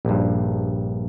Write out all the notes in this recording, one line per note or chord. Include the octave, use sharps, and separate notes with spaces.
A#1 G2